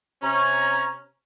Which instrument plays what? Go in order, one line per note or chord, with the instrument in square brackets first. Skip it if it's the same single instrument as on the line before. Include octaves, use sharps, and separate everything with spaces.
[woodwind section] C3 C#4 [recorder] A#5